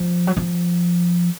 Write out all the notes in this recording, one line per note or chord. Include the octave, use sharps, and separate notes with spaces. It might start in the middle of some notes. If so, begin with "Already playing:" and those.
Already playing: F3
F#3
F3